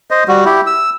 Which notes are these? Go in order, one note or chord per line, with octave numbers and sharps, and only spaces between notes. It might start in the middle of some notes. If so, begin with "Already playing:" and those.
C5 D#5
G3 F#4
E4 G4
E6